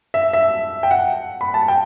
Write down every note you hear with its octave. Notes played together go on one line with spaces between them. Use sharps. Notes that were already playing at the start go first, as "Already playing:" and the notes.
E5
E5
G5
F#5
B5
A5
G5